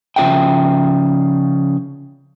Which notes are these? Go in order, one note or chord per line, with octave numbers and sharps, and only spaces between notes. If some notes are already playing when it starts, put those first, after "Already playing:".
C#3 F3 D4 G#4 E5 G5